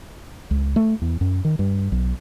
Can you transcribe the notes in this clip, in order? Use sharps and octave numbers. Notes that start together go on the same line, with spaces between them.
C#2
A3
E2
F#2
D#3
G2
B1